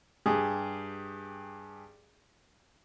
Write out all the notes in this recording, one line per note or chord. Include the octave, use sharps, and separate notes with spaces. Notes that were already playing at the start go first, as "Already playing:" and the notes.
G2 G4 G#4 D#6